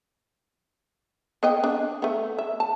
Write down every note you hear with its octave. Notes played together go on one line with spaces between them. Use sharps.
B3 D#5 G5
D4
A3 B3
E5
A5